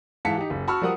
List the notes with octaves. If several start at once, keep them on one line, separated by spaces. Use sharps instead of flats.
G#2 E3 F5 A5 B6 C#7
D#4 G4
F#1
F#4 A5 B5 C#6 E6 F6
F3 G3 A#4 F#5 D#6